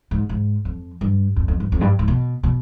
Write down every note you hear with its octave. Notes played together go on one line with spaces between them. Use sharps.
G#2
G#2
F2
G2
F2
F2
G2
F2
G2
G#2
B2
B2